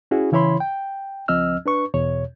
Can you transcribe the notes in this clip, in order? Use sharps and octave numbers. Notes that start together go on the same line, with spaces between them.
C#4 E4 F#4 G#4
C#3 E3 E4 C#5 B5 C6
G5
C#2 F3 C4 D#5 E6 F6
D4 B4 C#6
E2 B2 C#5